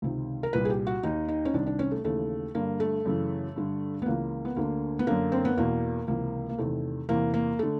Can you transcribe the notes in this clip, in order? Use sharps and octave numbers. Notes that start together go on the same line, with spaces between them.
C#2 C3 D#3
A#4
C2 A#2 B4
G#4
G4
F#4
D#2 D#3 D#4
D#4
C#4
C2 C3 D#3 D4
D4
C#4
A3
D#2 C#3 E3 A3
G2 D3 A#3
A3
F#2 C#3 E3
G2 D3
B3
C#2 C#3 E3 A#3
B3
D2 D3 A#3
B3
F#2 D3 A#3
C4
B3
E2 B2 A#3
C#2 C3 E3 A#3
A#3
E2 C3 D#3 A3
E2 C3 E3 A#3
A#3
D3 A3